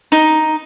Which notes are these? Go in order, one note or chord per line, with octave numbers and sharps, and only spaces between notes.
D#4